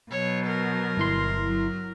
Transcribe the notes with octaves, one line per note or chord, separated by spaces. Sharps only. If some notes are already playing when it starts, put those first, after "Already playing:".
B2 F#3 C#5
A#4
G1 E4 C6
F#3